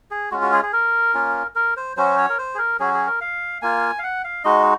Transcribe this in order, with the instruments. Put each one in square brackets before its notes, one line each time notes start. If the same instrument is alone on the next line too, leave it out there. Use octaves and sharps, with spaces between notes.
[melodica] G#4
G#3 C#4 F4 F#4
F#4
G#4
G#4
A#4
A#3 C#4 F4
A#4
C5
F#3 C#4 F#4 C5
C#5
A#4
C5
G#4
A#4
F#3 C#4 F#4 G#4
G#4
A#4
F5
A#3 F4 G#5
F5
F#5
F5
G#3 D#4 F#4 D#5